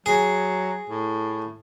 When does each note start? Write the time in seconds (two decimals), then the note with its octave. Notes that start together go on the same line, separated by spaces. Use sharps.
0.06 F#3 G#4
0.90 A2